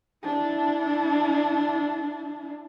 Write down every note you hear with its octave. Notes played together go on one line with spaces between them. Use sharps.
D4 E4